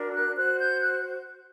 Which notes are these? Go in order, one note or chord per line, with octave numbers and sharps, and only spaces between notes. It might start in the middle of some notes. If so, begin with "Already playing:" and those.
Already playing: D4 F#4 A#4
F#6
F#4 C5 F#6
G6
F#6